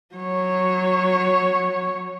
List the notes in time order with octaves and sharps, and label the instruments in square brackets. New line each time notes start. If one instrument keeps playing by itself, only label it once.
[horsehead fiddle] F#3 C#5